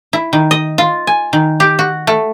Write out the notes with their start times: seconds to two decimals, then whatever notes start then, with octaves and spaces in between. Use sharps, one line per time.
0.13 E4
0.33 D#3
0.51 D#5
0.78 F4
1.07 G#5
1.33 D#3
1.60 G4
1.79 F#4
2.07 A3